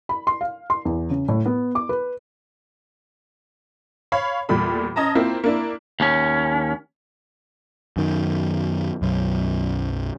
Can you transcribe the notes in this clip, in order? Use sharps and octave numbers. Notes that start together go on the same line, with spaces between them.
B5
C6
F5
C6
E2
C#3
A2
B3
D6
B4
C#5 F5 B5
E2 A#2 G3 A3 B5
C#4 D#5 A5 A#5
A#3 C4 E4 F4
A#3 D4 E4
D#2 C#4
F#2 D#3
B1 F#2